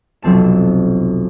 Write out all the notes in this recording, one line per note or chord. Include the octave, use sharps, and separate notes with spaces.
F1 B1 C4 A5 E7